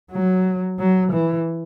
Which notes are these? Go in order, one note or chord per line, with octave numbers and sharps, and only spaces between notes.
F#3
F#3
E3